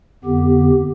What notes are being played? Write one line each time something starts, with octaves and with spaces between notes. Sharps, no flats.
F2 D3 B3 G4